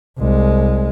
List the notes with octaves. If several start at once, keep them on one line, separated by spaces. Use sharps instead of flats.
C2 G#3